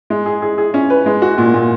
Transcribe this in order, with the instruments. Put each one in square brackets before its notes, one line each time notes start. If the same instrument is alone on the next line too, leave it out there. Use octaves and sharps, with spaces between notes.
[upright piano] G#3
G#4
G#4
G#4
C#4
B4
G#3
F#4
A#2
A#2